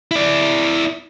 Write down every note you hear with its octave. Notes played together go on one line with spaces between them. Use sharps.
E4 D5